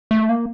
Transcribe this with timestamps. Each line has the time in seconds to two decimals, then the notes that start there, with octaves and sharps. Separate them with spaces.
0.11 A3
0.29 A#3